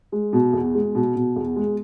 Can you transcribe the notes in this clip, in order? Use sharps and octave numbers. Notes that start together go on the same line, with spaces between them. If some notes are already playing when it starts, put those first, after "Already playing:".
G#3
B2
E2
G#3
B2
B2
E2
G#3